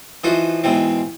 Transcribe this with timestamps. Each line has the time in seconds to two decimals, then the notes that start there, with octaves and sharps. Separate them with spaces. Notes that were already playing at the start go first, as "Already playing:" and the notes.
0.24 E3 F3 D#4 F#4 C5
0.64 G#2 B2 E3 C4